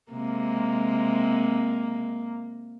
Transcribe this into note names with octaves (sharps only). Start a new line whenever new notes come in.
C3 G#3 A#3